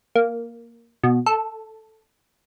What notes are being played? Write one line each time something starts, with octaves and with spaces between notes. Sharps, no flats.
A#3
B2
A4